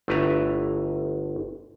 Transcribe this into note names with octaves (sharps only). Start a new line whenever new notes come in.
G1 A3 E4 B4 E5 A#5